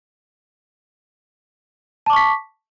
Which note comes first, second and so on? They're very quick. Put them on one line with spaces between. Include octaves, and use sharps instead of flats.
A5 D6 C#6 B6